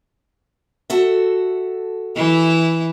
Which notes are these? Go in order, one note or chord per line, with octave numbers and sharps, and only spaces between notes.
F#4 A4 E5
E3 E4